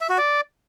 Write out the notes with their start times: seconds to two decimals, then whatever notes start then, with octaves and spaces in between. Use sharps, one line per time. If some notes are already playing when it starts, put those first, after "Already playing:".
0.01 E5
0.10 F#4
0.18 D5